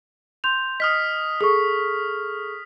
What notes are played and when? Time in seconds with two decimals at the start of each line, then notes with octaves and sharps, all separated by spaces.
0.44 C6 G6 F7
0.80 D#5 D#6 F6 B6
1.41 G#4 A4 C#6 D#6